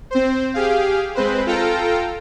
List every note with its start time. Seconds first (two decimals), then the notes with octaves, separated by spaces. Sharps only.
0.11 C4 C5
0.54 G4 G#4 F5
1.15 G#3 C4 B4 C5
1.46 F4 A4 F5 G5 A#5